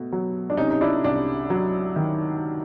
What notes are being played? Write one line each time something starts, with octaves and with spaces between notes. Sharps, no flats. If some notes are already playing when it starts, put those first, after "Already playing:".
Already playing: B2 A3
F#3
D4
C3 C#4 D#4
D#4
D4 E4
C2 D4
F#3
D#3